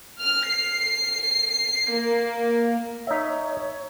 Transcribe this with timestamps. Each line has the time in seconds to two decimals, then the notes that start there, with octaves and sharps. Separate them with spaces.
0.20 F6
0.50 C7
1.95 A#3
3.07 D#4 C#5 E5